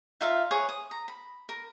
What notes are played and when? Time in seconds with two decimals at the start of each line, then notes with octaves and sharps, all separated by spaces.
0.21 D#4 F4 E5 F5
0.51 G#4 B4 C#5
0.69 D#6
0.91 A#5
1.08 B5
1.49 A#4